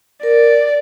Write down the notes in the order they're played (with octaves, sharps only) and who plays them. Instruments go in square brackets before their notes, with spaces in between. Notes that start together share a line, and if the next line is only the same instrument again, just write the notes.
[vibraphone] A#4 [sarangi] D5